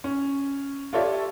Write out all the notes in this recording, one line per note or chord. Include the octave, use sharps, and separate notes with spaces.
C#4
F4 G4 A4 C#5 D5 E5